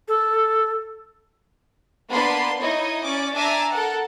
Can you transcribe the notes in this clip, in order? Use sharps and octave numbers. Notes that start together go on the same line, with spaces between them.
A4
A#3 B3 D4 B4 B5 C6
D#4 E4 C#5 D#5
C#4 D5 D6
D4 E5 G#5 A#5 D6 E6
A4 A#4 F#5